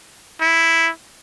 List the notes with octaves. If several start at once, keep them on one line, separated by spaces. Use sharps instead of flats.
E4